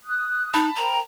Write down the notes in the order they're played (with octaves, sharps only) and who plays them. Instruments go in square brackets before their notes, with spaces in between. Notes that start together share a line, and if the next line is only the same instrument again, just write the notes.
[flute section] D#6 F#6
[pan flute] D#4 [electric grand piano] A5 B5
[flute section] A#4 C5 G5 [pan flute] A#5